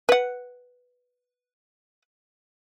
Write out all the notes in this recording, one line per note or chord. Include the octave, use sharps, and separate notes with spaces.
B4 F#5